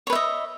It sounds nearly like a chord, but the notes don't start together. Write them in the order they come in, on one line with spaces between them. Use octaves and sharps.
C#5 B4 E5 D#5